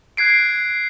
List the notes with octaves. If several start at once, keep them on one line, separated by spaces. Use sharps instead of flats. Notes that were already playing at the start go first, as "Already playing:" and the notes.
F#6 G#6 C7 D7